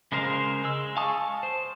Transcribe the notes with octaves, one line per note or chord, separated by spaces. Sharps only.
C#3 G#3 A#4 C5 F5
G#3 E6
F5 G#5 A5 C#6 D#6
C5